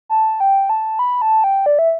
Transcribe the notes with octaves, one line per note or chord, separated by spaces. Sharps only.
A5
G5
A5
B5
A5
G5
D5
E5